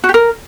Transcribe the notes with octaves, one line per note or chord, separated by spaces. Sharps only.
F#4
G4
A#4